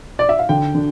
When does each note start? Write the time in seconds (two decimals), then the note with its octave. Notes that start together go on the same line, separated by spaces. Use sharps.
0.19 D5
0.29 E5
0.39 F5
0.49 D3 G5
0.75 D3